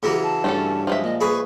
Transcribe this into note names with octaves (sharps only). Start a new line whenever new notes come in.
C#3 E3 F#3 G4
A5
G2 A3 C#4 A4
F3 G#3 E5
A#2 D#5
G#4 B4 C#6